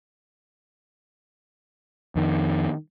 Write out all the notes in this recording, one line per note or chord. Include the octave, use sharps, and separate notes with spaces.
F2 D#3